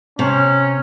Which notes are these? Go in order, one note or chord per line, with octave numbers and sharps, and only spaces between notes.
C3 C#4